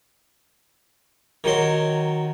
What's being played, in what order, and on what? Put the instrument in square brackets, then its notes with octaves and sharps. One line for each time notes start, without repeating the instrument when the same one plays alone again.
[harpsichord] D#3 F#3 C6